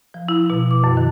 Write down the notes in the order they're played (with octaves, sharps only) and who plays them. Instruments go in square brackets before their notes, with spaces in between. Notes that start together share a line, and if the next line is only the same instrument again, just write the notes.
[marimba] F3
E4
B2
D6
F#2
D#3